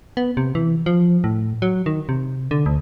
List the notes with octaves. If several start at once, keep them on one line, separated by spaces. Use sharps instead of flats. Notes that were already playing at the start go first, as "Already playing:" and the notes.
B3
C3
E3
F3
A2
F#3
D#3
C3
D3
D2